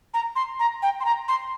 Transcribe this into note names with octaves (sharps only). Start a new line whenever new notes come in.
A#5
C6
A#5
G5
C6
A#5
C6